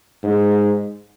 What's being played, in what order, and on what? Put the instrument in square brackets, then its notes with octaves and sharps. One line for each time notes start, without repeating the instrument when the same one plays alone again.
[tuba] G#2